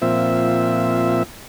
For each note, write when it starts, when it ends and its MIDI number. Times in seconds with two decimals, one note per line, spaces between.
0.02 1.23 46
0.02 1.23 53
0.02 1.23 60
0.02 1.23 76